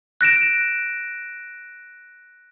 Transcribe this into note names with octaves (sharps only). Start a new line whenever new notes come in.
F#6 A#6 D7 E7